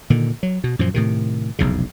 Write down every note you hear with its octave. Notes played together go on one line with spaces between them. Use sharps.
A#2 D3 D#3
F#3
B2
F#2 A#2 F3
A2 C3 D#3
F1 B1 E2 C#3